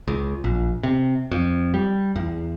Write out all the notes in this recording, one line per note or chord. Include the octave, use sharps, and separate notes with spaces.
C#2
A#1
C3
F2
G3
E2